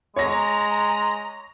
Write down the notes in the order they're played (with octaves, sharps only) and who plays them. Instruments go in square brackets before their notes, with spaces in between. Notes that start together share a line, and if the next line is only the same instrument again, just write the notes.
[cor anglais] G#3 [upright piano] C#5 A#6 [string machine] A#5